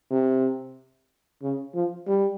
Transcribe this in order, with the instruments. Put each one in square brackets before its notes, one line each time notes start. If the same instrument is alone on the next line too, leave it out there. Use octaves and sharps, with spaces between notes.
[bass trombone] C3
C#3
F3
G3